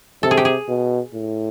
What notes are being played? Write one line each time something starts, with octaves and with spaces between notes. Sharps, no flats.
C3 A4
G#4
G4
G#4
B2
A2